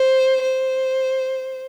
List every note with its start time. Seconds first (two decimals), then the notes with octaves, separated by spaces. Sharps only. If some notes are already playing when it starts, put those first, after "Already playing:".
Already playing: C5
0.42 C5